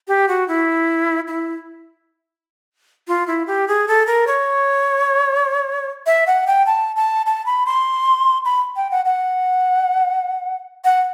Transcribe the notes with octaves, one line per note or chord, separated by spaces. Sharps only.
G4
F#4
E4
E4
F4
E4
G4
G#4
A4
A#4
C#5
E5
F#5
G5
A5
A5
A5
B5
C6
B5
G5
F#5
F#5
F#5